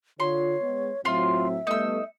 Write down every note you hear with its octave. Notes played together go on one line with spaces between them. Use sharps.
D3 F4 C#5 C6
G#3 B3
A2 F#3 C4 F4 E5 C6
G3 A3 B3 D#4 E6